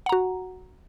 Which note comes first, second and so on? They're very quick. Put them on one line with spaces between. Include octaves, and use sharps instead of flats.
F#5 A#5 F#4